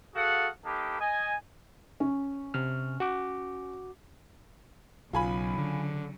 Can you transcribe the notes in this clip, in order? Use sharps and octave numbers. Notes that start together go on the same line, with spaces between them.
F#4 G#4 A4 F5 F#5
A#3 D#4 G4 A4 B4
D#5 G#5
C#4
C3 F6
F#4 D6
B1 C#3 F#3 F4 G#5 B5
D3